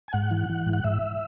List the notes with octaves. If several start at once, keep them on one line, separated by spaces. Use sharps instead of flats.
G#5
G#2 F#5
E3
E3
G#2
F#5
G#2 E5